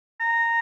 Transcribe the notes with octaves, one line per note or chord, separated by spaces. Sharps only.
A#5